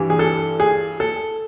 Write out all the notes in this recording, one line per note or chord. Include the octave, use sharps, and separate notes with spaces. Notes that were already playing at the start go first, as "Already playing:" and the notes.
Already playing: G2 E3 G3
G#4
A4
G#4
A4